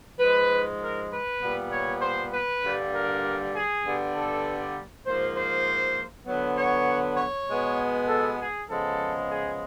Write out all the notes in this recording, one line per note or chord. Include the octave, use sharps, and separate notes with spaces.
G#2 F3 G#3 B4
A#4
B4
A#2 G3 B3
C#5
C5
B4
G2 D3 G3 A#3
A#4
G#4
G2 D3 G3 B3
A4
G#2 F3 A#3 C5
C5
D3 F#3 B3
C#5
C#5
B2 G#3 B3
A4
G#4
C#3 F3 G#3 B3 A4
G#4